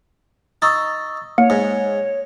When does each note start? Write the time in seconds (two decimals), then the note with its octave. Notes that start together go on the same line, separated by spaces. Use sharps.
0.62 D#4 C#6 E6 A6
1.38 A#3 C#5 C#7
1.50 G#2